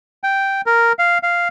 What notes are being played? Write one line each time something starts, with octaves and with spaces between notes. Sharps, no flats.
G5
A#4
F5
F5